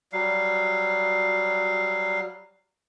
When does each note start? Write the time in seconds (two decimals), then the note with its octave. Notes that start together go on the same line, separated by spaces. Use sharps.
0.13 F#3 G3 F5